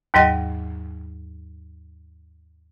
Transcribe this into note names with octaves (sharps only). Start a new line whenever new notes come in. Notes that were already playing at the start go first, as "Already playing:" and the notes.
D#2 G#2 F#3 D#5 A#6